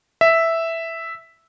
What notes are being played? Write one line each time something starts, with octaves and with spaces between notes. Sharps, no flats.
E5